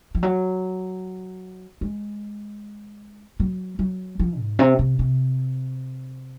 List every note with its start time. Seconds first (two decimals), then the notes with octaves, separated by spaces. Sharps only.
0.15 F3
0.23 F#3
1.81 G#3
3.40 F#3
3.79 F#3
4.19 F3
4.39 G#2
4.59 C3
4.79 C3
4.99 C3